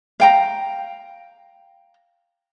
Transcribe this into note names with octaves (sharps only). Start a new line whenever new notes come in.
F5 G5 A#5